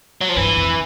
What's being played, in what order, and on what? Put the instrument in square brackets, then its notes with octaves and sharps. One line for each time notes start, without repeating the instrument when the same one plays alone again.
[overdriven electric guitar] F#3
F3
[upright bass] G2 [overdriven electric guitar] E3
[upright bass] F2